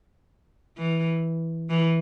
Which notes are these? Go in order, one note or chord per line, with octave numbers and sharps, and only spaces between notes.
E3
E3